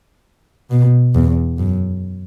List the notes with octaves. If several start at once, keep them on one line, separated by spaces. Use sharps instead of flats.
B2
E2
F#2